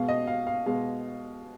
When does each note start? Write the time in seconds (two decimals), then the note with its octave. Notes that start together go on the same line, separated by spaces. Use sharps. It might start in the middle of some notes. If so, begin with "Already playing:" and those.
Already playing: B2 G#3 F5
0.08 D#5
0.27 F5
0.47 F5
0.66 B2 G#3 F5